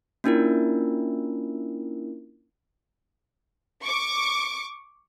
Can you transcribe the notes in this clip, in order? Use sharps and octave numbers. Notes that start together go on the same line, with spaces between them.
A#3 C#4 D4 E4 F4 A#4
C#6 D6